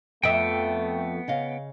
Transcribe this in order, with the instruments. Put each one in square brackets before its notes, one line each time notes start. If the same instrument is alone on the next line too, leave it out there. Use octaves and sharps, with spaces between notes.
[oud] F2 E5 [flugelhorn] A3 [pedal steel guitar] B3 G5
[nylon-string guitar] C#3 D#5 F5